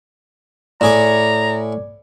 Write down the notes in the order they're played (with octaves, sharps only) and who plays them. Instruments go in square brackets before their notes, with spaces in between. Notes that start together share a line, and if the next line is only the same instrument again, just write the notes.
[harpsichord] A2 G#4 D6 [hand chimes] D5 [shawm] A#5